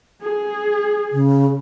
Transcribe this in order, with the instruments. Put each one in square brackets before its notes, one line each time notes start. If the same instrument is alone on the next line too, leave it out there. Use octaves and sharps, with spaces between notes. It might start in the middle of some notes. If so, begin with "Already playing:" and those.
[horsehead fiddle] G#4
[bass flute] C#3